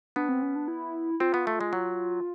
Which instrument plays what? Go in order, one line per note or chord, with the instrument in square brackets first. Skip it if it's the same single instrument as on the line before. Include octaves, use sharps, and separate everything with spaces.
[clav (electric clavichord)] B3 [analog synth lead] D4
[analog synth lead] C4
C#4
D4
E4
[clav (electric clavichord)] C4 [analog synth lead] F4
[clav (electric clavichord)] B3
A3
G#3
F#3